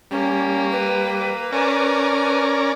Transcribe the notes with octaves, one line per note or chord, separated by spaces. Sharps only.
G3 A#3 C#4
B4
C#4 A#4 D5 G#5 A5